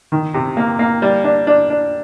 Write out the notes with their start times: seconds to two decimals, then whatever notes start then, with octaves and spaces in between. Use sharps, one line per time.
0.12 D#3
0.34 C3
0.57 A#3
0.79 A#3
1.02 G3
1.24 D4
1.47 D4
1.70 D4